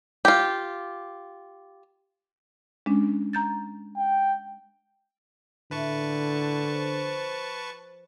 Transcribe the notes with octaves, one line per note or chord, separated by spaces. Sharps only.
F4 G4
G#3 C#4 D4
A#5 G6 A6
G5
A2 D3 E3 E4 B4 A5 C#6
F3